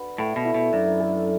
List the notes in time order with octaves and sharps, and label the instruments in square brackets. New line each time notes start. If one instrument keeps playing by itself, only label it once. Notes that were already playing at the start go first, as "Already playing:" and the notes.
Already playing: [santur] D4 F#4 B4
[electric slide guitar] A2 [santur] A3
[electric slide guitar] B2
[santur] E4
[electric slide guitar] B2
[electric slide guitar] F#2 [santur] D4
[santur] A4